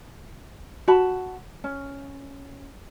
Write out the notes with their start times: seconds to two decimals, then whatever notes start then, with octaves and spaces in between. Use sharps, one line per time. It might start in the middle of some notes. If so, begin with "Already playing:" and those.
0.88 F#4 A5 B5
1.64 C#4